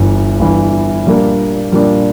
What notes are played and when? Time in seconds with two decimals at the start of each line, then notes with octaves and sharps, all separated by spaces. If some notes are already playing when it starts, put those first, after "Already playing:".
Already playing: G1 G2 E3
0.39 G1 G2 E3
1.07 A#2 G3 A#3 D4
1.72 A#2 G3 A#3 D4